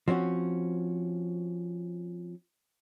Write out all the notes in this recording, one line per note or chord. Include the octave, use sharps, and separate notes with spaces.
F3 C4 C#4 F#4